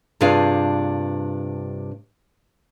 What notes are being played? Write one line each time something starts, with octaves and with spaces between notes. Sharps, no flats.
G2 C3 D4 F4 G#4 F5